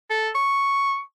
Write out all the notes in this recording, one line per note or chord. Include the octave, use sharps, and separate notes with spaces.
A4
C#6